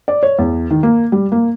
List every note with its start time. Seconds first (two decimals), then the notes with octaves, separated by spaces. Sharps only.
0.08 D5
0.23 C#5
0.39 E2
0.71 D#3
0.83 A#3
1.12 G3
1.32 A#3